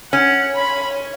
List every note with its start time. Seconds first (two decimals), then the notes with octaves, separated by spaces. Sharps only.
0.13 C#4 F#5
0.56 B5